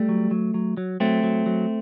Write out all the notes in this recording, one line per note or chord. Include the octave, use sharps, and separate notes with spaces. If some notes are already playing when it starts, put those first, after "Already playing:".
Already playing: G3 A3
F#3
F#3
F#3
F#3
F#3 A3 C4
F#3
F#3